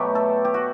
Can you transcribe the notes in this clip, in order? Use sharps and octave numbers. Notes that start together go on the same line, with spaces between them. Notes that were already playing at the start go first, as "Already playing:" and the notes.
Already playing: B2 F#3 A3 G4
A4
G4
F#4